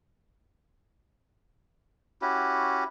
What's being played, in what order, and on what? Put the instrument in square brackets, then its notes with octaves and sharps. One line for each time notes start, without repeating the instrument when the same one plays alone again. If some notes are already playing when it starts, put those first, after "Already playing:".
[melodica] C#4 E4 F#4 G4